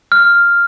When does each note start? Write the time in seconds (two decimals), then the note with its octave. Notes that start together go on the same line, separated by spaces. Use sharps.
0.12 F6